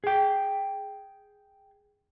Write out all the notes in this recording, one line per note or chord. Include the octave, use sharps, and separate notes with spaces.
G#4 G5